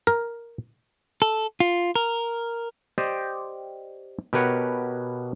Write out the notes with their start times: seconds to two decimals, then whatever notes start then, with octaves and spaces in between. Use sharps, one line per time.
0.07 A#4
1.22 A4
1.60 F4
1.96 A#4
2.98 G4 C5 D5 D#5 G5
4.33 B2 G4 A#4 B4 C#5 F#5